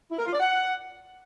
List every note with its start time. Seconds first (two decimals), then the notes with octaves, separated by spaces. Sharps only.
0.11 E4
0.19 A#4
0.26 F4
0.33 D5
0.40 F#5